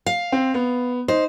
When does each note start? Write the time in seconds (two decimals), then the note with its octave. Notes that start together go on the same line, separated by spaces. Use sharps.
0.06 F5
0.32 C4
0.54 B3
1.08 D#4 C5